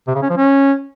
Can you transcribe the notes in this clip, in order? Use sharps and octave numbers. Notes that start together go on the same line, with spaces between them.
C3
C#3
C#4
F3
C#4